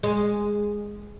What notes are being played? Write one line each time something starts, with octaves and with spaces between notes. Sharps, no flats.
G#3